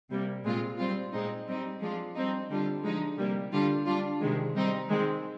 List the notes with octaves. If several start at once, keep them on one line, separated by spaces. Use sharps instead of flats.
C3 G3 A#3
A#2 G#3 C4 F4
G3 C4 F4
A#2 G#3 C4 D#4
G3 C4 D#4
F3 G#3 D4 F4
G3 C4 D#4
D3 G3 D4 F4
D3 F3 G#3 D#4
C3 G3 A#3
D3 G3 D4 F4
G3 D4 F4
C3 D#3 G#3
G3 C4 D#4
D#3 G#3 C4